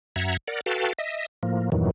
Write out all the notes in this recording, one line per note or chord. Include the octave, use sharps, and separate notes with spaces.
F#2 E5 F#5 A#5 G#6
A#4 D5 F#5
F#4 A4 B4 F5 G5 A5
D#5 E5
A2 F3 A#3
E2 G2 A#2 D#3 E3 F#3